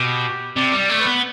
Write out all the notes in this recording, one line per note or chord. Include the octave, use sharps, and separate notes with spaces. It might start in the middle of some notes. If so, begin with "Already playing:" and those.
Already playing: B2 G4
C3 D5
G3
D5
A3
B4
B3